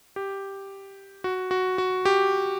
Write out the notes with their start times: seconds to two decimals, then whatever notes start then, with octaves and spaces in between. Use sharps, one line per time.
0.16 G4
1.24 F#4
1.51 F#4
1.78 F#4
2.05 G4